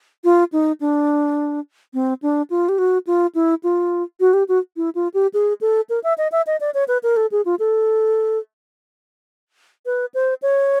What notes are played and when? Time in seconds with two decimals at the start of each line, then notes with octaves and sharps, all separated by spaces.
0.24 F4
0.52 D#4
0.81 D4
1.94 C4
2.22 D4
2.50 F4
2.69 G4
2.78 F#4
3.07 F4
3.35 E4
3.63 F4
4.20 F#4
4.33 G4
4.49 F#4
4.77 E4
4.95 F4
5.14 G4
5.34 G#4
5.61 A4
5.89 A#4
6.04 E5
6.18 D#5
6.32 E5
6.47 D#5
6.60 D5
6.74 C#5
6.88 B4
7.03 A#4
7.16 A4
7.32 G#4
7.45 F4
7.59 A4
9.86 B4
10.14 C5
10.42 C#5